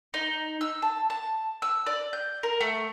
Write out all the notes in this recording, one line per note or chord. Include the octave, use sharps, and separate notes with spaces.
D#4
E6
A5
A5
E6
D5
G6
A#4
A3